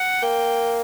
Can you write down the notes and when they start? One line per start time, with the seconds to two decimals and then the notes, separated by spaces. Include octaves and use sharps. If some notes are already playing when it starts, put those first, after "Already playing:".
Already playing: F#5
0.22 A#3 G5